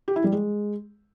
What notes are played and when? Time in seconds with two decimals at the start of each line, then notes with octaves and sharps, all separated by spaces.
0.08 G4
0.16 E4
0.24 G3
0.32 G#3